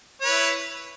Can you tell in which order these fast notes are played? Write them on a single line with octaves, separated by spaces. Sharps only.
C#5 B4 E4